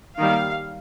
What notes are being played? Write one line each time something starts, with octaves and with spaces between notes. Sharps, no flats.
D#3 G3 A#3 F5